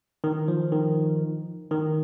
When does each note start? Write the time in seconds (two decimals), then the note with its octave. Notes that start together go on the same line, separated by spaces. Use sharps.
0.24 D#3
0.48 F3
0.72 D#3
1.71 D#3